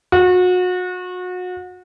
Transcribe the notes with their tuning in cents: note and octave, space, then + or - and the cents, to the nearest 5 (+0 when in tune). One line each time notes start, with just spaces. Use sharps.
F#4 -30